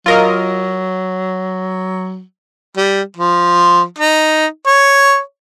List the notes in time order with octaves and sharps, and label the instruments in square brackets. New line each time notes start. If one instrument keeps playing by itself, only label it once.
[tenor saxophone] F#3 [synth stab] F4 A#4 D#5
[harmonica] G3
F3
D#4
C#5